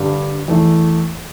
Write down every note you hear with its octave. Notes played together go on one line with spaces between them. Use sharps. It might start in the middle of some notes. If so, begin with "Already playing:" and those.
Already playing: G2 D3 G3 D4
E2 E3 A3